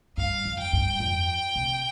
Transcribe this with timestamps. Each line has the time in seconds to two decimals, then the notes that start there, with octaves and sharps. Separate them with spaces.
0.17 G2 F5
0.45 F2
0.59 G5
0.73 G2
1.00 F2
1.56 C3